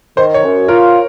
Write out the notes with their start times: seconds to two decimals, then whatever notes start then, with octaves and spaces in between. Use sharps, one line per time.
0.17 D#3 C5
0.34 C#5
0.43 F#2
0.68 F4 A#4